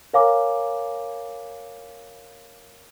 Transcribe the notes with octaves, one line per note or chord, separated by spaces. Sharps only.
A#4 C#5 F5 G#5 A#5 D6